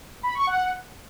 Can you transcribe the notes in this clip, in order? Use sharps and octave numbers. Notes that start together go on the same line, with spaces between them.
B5
C#6
F#5